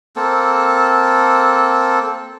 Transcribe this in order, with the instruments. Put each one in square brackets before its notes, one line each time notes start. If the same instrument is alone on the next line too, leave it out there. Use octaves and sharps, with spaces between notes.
[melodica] A#3 C4 A4